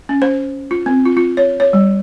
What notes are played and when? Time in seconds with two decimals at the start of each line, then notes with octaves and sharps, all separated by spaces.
0.09 C#4
0.22 C5
0.71 F4
0.86 C4
1.05 F4
1.17 F4
1.37 C#5
1.60 C#5
1.73 G3